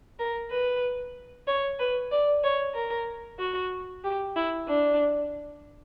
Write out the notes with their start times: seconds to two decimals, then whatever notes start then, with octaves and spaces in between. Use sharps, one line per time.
0.19 A#4
0.51 B4
1.47 C#5
1.79 B4
2.11 D5
2.44 C#5
2.75 A#4
3.39 F#4
4.04 G4
4.36 E4
4.68 D4